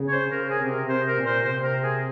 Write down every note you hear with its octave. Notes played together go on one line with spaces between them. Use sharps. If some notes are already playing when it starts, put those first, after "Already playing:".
Already playing: C#3
C#5
C5
C#3 A#4
G#4
C3
A#4
C3 C5
A#4
A#2
C5
C3 C5
A#4
G#4